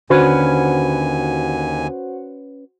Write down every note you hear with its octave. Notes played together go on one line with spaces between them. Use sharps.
D#2 D3 C#4 F#4 B4 C5 F#5 G#5